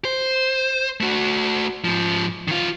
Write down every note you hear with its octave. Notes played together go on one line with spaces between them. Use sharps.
C5
A3 F#4
G#2 F3
D#3 F4